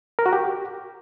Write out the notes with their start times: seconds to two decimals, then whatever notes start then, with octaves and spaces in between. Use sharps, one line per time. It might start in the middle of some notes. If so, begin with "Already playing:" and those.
0.19 A#4
0.26 F#4
0.33 G4